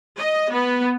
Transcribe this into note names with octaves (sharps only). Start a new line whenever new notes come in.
D#5
B3